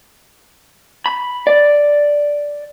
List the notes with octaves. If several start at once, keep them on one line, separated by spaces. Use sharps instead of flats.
B5
D5